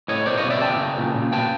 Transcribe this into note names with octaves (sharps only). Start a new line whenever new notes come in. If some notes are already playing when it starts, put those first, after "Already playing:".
A2 C#5 D#5
B2 C5 D5
C#5 D#5
B2
D5 E5
C#3 G5 A5
C#3
A#2
A#2
B2 G5 A5